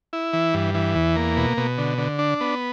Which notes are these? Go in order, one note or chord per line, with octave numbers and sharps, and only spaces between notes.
E4
E3
G2
E3
E2
A#3
B2
B2
D3
D3
D4
B3